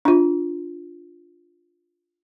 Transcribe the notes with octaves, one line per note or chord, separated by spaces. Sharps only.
D4 F4